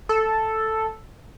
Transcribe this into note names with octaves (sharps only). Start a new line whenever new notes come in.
A4